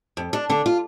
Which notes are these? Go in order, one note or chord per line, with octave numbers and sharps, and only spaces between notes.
F2
D4
D3 D4
F4